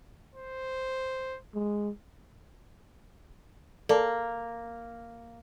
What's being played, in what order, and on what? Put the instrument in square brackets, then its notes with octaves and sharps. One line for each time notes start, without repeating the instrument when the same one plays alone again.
[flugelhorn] C5
[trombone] G#3
[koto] A#3 [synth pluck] A4 D5 A5